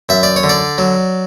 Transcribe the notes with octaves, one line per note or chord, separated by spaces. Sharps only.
F#2 E5
D5
C#5
D3
D5
F#3